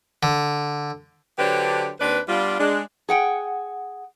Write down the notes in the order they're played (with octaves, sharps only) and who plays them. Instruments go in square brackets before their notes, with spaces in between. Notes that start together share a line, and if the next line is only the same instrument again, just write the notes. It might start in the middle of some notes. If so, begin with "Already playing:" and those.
[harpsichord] D3
[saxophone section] D3 F#3 D4 G4 B4 C5
D#2 C4 D4 B4
G3 B3 D4 F4
G#3 D4
[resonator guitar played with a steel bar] G#4 F#5 G5